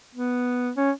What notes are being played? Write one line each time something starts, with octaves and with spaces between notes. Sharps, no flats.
B3
C#4